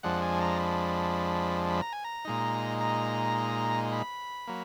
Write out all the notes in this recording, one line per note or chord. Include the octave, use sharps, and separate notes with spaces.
F2 F3 G#3 D4 F#5
G#5
A#5
B5
B5
A#5
G#5
A#5
A#2 G#3 D#4
A#5
B5
F#3 A#3